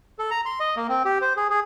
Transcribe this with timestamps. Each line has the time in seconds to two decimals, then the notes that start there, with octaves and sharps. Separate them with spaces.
0.19 A4
0.31 A#5
0.46 C6
0.60 D#5
0.77 A#3
0.89 C4
1.05 G4
1.21 C5
1.37 G#4
1.50 G#4